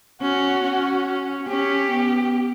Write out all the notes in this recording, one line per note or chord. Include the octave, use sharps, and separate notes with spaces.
C#4 F#4
C#4
C#4 G4
B3